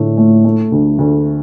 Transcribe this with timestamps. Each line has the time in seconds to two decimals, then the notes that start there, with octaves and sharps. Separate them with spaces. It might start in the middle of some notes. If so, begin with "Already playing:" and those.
Already playing: A2 D3 A3
0.18 A3
0.45 A3
0.72 D2
0.98 D2